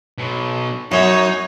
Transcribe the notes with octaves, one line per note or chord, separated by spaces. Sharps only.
B2 F#3
F#2 D#4 C#5